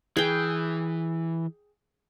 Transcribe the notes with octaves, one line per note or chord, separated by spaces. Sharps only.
E3 G#4 G5